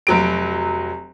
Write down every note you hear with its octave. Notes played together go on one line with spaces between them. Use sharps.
F1 F#3 D7